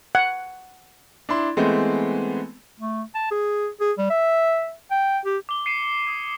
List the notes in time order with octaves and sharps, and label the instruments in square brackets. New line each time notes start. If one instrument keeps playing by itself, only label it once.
[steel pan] F#5
[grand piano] D4 E4 C6
E3 G#3 A3 B3 C4
[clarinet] A3
A5
G#4
G#4
G3
E5
G5
G4
[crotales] D6 G7
C7 C#7 D#7 E7
D#6 G#6